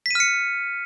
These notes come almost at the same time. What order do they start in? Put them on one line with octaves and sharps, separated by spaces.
B6 D#7 F6 C#7